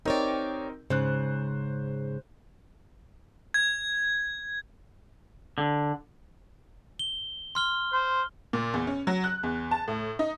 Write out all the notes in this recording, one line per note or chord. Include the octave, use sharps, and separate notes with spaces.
C4 D#4 G4 A#4 C#5 D5
G#2 C#3 C5 F#6
G#6
D3
G7
C6 F6 G7
C5
A#2
E2
C#4
F#3
F#6
E2
A5
A2
D#4